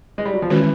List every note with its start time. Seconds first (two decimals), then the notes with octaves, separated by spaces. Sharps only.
0.18 G#3
0.25 G3
0.34 F#3
0.42 F3
0.50 D#3 E3 G#3 C#4 F#4